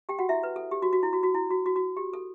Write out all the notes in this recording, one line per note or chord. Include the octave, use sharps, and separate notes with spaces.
G4 G5
F#4 F#5
E4 E5
B4
A4
G4
F#4
F#4
E4
F#4
F#4
E4
F#4
F#4
F#4
G4
A4